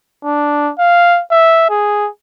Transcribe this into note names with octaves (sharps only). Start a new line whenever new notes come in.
D4
F5
E5
G#4